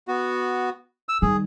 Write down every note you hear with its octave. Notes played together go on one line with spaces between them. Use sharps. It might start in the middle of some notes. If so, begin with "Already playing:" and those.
B3 F#4
E6
D#3 G3 G#4